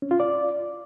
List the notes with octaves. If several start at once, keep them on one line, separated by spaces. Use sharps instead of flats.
C#4
F4
D5